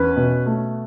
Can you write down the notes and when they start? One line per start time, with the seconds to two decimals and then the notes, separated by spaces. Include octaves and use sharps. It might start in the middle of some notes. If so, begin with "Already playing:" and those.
Already playing: E2 C#4 B4
0.17 B2
0.46 A3